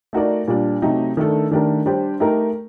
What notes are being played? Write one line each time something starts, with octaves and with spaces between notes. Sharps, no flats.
A3 D#4 F#4 A#4 D5
A#2 G3 D4
C3 F#3 A3 D#4 G4
D#3 A3 D4 A4
D#3 A3 D4 G4 A#4
G3 D4 G4 C5
A3 D#4 G4 A#4